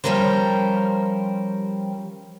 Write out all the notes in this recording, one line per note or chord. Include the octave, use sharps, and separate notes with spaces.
F3 G3 C#4 G4 A#4 C5